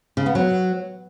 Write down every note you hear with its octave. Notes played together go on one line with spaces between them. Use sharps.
C#3
B3
F#3